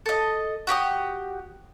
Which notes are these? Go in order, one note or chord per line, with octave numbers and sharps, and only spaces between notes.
A4 D#5
F#4 G4 D6 D#6